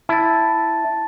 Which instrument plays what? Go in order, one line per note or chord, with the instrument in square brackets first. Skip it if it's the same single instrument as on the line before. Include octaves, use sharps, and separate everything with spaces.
[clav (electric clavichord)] E4 [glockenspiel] A5 A6